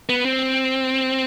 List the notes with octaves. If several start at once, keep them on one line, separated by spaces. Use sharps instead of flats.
B3
C4